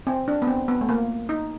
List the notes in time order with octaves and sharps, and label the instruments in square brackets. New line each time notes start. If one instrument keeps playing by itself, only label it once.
[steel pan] C4
D4
B3
C4
B3
A3
A#3
D#4